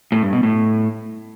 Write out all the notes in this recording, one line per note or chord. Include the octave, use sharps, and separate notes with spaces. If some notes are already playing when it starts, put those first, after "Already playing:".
A2
G2
B2
A2